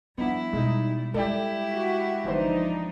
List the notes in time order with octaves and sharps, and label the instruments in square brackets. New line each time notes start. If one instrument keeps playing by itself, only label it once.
[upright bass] F3 [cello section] G3 [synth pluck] B3 D4 [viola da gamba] E4
[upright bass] B2 [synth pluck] G#3 D#4
[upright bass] G#3 [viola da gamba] E4 G4 [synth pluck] A4 D5 G5
[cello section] F#4
[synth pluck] G1 E3 C5 [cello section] F3 D4 D#4